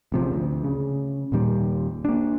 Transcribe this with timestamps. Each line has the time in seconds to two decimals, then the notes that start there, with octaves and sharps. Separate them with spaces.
0.12 A1 C3 F3
0.34 D2
0.64 C#3
1.32 D#1 A#2 D#3 G3
2.05 A#3 D4